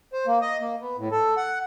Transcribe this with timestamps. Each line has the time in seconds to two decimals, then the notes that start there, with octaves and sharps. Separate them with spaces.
0.13 C5
0.27 A#3
0.41 D#5
0.60 A#3
0.81 B3
0.98 A2
1.11 A4
1.37 F#5